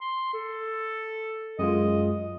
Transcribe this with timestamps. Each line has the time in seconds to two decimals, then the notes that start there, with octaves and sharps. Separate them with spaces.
0.01 C6
0.34 A4
1.59 F#2 G#3 F4 D#5